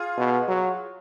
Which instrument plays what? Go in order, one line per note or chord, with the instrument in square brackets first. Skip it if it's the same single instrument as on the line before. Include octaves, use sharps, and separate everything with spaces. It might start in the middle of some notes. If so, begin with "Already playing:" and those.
Already playing: [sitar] F4 G#4
[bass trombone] B2
F#3